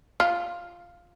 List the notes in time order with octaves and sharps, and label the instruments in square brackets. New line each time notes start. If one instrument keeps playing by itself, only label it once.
[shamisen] F4 [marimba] F6